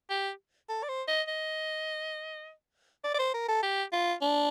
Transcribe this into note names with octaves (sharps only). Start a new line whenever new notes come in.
G4
A4
D5
C5
D#5
D#5
D5
D5
C5
A#4
A4
G4
F4
D4